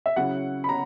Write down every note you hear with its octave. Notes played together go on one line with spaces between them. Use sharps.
E5
C#3 F#3 C#4 E4 F#5
B5
A#5